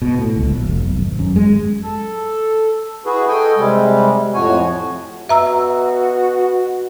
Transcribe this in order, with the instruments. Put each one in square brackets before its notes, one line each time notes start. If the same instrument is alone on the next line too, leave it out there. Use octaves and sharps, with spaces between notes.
[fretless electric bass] B2
A2
C#2
A#1
F1
B1
G#1
F#2
G#3
[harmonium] A4
E4 F#4 G#4 B4
A4 D#5 G5 G#5
C3 G3 G#3
F2 A2 F3 F#4 C#5 G#5
[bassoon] B2 [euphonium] F#4 [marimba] E5 A#5 E6